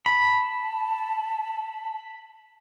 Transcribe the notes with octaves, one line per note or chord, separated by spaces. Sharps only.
A5 B5